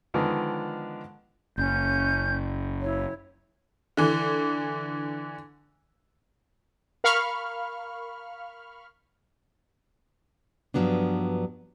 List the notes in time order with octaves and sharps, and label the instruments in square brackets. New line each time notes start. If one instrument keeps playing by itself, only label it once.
[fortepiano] D3 D#3 F3 G#3 B3
[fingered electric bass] F#1 [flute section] C#4 G6
[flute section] E4 C#5
[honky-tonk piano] D3 E3
[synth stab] A#4 F5 B5 C#6 F6
[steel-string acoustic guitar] G2 A#2 F3 F#3 B3 D4